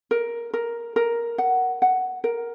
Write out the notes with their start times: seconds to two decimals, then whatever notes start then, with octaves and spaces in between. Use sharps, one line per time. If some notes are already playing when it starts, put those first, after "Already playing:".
0.11 A#4
0.53 A#4
0.96 A#4
1.38 F#5
1.82 F#5
2.24 A#4